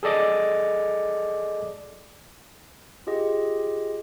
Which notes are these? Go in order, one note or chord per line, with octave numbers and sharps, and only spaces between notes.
G#4 A4 D5 D#5 D6
F4 G4 G#4 D#5